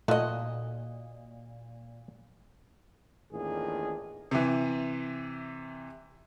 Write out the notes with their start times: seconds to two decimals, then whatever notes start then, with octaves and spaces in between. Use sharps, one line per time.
0.08 A#2 A3 D#4 F4 F#4 D#5
3.32 A1 E2 A#2 D#3 D4 G#4
4.31 C3 E3